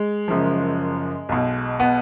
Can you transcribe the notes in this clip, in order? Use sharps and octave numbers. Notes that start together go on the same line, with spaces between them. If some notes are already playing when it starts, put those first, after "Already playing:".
Already playing: G#3
F#1 F#2 F3
B1 B2
B3